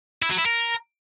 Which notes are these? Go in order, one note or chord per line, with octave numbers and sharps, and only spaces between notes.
E4
F#3
E4
A#4